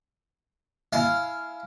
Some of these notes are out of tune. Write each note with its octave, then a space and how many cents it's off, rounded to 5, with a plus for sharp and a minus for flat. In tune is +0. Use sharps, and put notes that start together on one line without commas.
E4 +0 F5 -10 G#5 +20